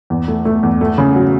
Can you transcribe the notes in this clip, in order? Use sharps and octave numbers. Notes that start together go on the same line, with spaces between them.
E2
A3
A3
E2
A3
C#3
F#3